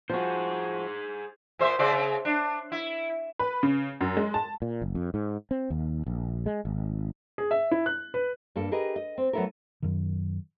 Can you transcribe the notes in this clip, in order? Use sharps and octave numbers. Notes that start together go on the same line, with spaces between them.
F3 F#4 G#4 C5
A#2 C5 E5
C#3 C5 D5
C#3
D4
E4
B4
C#3
F#2
G#3
A5
A#2
F#1
F2
G#2
C4
D#2
A#1
G#3
G#1
G#4
E5
E4
F#6
B4
G2 A#3 A4
G4 G#4 A#4 B4 D#5
D#5
C4
F#3 A3 B3 E4 A4 A#4
F#2 D#3